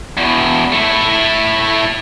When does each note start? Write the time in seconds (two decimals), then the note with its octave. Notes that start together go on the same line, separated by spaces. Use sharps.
0.17 E2 B2
0.72 A3 E4